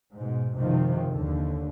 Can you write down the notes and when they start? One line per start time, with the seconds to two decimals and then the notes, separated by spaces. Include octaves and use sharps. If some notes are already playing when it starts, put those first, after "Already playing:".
0.14 G#2 B2
0.58 G#1 F#2 C3 D#3 F3
1.11 D#2 D3